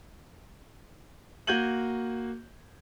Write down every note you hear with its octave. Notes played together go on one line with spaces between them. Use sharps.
A#3 F#4 G6 G#6 D#7 F#7